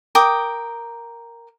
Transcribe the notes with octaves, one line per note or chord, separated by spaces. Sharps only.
A#4 G5 D6 D#6